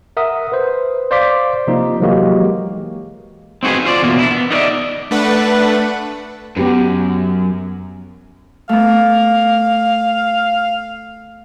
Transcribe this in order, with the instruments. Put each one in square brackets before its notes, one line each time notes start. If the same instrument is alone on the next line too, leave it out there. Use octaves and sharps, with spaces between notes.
[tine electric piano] A#4 E5 F#5 D#6
B4 C5
C5 D5 F5 C6 D6 B6
C3 F3 A#3 D#4
E3 F#3 G#3 A#3 F#4 G4
[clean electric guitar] C4 D#4 F#4 G#4 B4
F4 C5 D5
E2 B2 A#3
D4 E4
B3
D#4 A#4 B4 D5 E5
[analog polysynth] A3 D4 B4 F#5
[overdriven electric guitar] F#2 [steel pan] B3 G4 B4
[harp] A3 B3 [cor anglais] F5